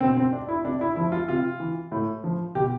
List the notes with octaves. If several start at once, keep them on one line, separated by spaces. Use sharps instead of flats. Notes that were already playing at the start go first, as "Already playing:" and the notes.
B2 C4
C4
D4
E4
C3 D4
E4
F3 E4
F4
C3 F4
E3
A2
F3
B2 G4